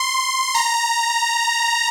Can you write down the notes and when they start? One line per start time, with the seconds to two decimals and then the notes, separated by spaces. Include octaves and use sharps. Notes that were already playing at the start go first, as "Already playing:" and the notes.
Already playing: C6
0.54 A#5